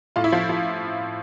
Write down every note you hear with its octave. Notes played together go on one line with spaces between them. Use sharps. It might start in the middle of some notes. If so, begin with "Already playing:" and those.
A2 F4
E4
F3 F4
F3